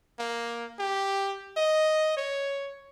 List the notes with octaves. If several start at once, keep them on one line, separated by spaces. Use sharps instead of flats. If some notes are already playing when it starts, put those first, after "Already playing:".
A#3
G4
D#5
C#5